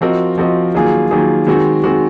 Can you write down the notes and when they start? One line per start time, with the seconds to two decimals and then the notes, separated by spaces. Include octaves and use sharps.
0.01 F3 C4 F#4 A#4 D#5
0.38 F3 C4 F#4 A#4 D#5
0.74 D#3 F#3 A#3 F4 G#4
1.11 D#3 F#3 A#3 F4 G#4
1.47 D#3 G#3 C4 F#4
1.84 D#3 G#3 C4 F#4